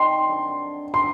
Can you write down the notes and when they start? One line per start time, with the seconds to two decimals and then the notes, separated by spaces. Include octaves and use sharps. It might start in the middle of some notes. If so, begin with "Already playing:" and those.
Already playing: D#3 G3 C4 D#4 C6
0.26 G2 D3 F#3 C4
0.93 F#3 A3 D4 G4 C6